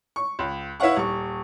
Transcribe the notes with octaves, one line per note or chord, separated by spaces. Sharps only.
C#6
C#2
E4 B4 C#5 F5 F#5 C#6
D#1 C#6